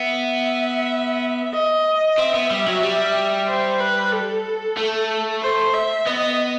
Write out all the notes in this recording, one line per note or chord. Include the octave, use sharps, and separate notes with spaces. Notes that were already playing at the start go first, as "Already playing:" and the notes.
Already playing: B3 E5
D#5
C4 E5
B3
G3
F#3
G3
C5
B4
A4
A3
C5
E5
B3 D#5